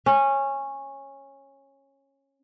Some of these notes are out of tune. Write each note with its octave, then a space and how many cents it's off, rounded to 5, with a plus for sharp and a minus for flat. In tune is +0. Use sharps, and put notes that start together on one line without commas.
C#4 -15